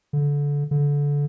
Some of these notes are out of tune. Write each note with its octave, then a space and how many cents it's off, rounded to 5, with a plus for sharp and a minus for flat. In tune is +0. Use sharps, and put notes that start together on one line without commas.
D3 -25
D3 -25